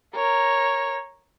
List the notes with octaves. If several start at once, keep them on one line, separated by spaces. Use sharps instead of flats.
A#4 C#5